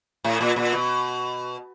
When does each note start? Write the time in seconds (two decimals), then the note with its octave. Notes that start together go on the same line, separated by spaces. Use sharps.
0.24 A2
0.41 A#2
0.56 A#2
0.73 B2